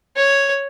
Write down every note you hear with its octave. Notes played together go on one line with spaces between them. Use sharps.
C#5